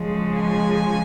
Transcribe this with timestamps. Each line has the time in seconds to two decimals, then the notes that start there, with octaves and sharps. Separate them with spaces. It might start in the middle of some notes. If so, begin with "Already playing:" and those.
Already playing: C#3 F3 G#3
0.41 G#5